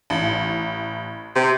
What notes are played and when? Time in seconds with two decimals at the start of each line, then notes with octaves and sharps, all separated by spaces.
0.10 A1
1.36 C3